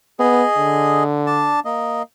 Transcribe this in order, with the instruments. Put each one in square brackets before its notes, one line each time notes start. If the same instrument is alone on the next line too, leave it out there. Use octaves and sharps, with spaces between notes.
[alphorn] B3 [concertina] G#4 D#5
[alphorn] D3
[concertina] D4 A5
A#3 D#5